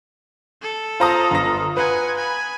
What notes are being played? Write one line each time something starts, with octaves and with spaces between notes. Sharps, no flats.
A4
F4 C5 A5 A#5 D#6
G1 A#6
B4 F#5 G#5
G#5 B5